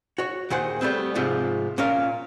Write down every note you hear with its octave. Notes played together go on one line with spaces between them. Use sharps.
F#4 C#5
D#2 A#2 G#4 C5 F#5
G3 A3 B3 C4
G#2 C3 F3 A3
A#2 C#4 A#4 F5